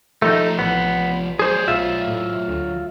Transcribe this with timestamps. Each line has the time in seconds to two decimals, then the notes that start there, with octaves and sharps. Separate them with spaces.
0.22 F3 A3 D#4 G4
0.59 A1 B3
1.39 F#3 G#4 C5 D5
1.68 B1 F4 E5
2.07 A2
2.48 D2